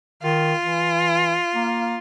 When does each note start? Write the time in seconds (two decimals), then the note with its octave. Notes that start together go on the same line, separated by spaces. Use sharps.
0.23 D#3 F4
0.62 E3
1.55 A#3